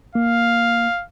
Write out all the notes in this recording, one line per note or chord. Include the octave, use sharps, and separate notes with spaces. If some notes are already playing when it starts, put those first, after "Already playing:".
A#3 F5